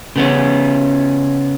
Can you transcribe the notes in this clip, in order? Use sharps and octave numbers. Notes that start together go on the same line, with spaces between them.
C#3 B3 C#4